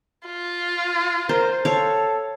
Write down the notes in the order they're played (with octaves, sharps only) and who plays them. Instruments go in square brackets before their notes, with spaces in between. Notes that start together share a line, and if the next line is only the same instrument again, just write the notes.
[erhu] F4
[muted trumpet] A#4 [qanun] C5
[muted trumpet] A4 [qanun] C#5 F5